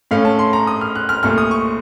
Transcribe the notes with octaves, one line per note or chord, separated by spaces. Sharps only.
A2 A3 C#4 F5
A5
C6
A#5
D#6
F6
F#6
F6
C2 A#2 A3 F6
D#6
C#6